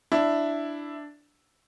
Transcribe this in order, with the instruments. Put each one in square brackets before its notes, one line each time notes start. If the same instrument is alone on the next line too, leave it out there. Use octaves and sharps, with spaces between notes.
[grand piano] D4 E4